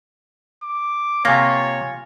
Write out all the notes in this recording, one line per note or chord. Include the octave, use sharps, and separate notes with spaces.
D6
C3 A#3 F4 C#5 G#5 C#6 A#6